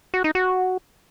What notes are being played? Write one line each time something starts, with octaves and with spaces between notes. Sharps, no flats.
F#4
D#4
F#4